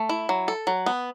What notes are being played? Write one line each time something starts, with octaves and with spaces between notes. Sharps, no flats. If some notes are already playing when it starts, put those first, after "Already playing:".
Already playing: A3
E4
F#3
A4
F#3
B3